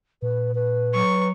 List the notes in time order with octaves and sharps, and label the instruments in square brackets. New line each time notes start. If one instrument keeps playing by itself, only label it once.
[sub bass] A#2 [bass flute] B4
[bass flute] B4
[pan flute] F#3 [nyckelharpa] C#6